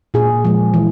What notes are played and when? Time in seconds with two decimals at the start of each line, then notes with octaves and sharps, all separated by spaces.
0.14 A#2 G#4
0.45 F3 G#3
0.74 E3